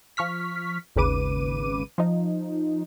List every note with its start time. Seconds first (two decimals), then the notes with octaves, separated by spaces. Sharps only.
0.17 F3 C#6 F6 B6
0.96 G#1 D#2 C#3 B4 D6 D#7
1.98 F3 D#4